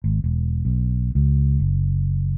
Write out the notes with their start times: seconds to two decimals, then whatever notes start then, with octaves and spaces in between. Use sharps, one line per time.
0.04 G#1
0.24 E1
0.65 B1
1.15 C#2
1.60 F#1